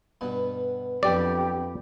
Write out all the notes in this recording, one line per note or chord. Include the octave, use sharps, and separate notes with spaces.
G2 B2 B3
F2 F#3 B3 D4 G4 D5